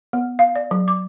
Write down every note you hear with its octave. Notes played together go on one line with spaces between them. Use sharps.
B3
F5
D5
F#3
D6